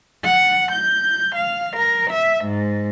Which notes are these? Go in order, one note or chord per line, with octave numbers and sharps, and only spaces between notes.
F#5
G6
F5
A#4
E5
G#2